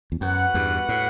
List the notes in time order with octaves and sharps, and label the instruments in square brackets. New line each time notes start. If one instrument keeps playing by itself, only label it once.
[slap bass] E2
[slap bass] F#2 [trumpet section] F#4 B4 F#5
[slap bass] E2 G2
A2